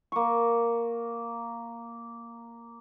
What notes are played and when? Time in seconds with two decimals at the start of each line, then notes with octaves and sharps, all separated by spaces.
0.12 A#3 C#6